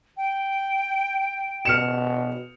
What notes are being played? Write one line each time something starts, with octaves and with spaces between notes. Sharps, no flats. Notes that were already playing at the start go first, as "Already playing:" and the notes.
G5
B2 F6 C#7 E7